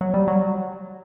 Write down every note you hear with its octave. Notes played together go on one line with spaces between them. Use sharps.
F#3
G3
F#3